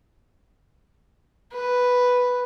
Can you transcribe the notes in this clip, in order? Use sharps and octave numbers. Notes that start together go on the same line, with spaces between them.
B4